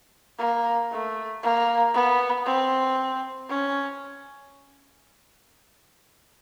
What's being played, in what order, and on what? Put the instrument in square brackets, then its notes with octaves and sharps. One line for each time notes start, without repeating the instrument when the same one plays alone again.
[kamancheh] A#3
A3
A#3
B3
C4
C#4